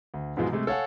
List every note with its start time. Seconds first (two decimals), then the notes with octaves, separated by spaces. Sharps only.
0.14 D2
0.37 G#2 B2 E3 F3 G#3
0.52 C3 G#3 A3
0.67 A4 C#5 F5 F#5 G#5